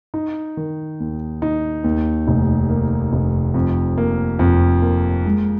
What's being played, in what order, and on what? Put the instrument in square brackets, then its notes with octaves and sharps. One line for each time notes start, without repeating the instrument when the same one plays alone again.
[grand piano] D#4
D#3
D#2
D#4
D#2
F1
A#3
F1
F2
A#3
F2
A#3
G#3